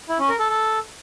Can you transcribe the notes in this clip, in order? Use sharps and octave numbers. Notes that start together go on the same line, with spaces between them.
E4
C#4
A#4
A4
A4